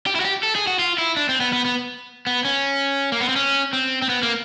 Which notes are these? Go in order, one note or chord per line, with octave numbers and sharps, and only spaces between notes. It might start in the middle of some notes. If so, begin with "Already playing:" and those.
G4
E4
F#4
G4
A4
G#4
F#4
F4
E4
D4
C4
B3
B3
B3
B3
C#4
A#3
B3
C4
C#4
C4
C4
B3
A#3